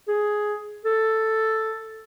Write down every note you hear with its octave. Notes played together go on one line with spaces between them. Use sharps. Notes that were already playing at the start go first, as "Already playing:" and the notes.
G#4
A4